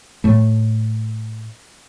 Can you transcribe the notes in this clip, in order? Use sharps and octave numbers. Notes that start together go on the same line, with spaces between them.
A2 A3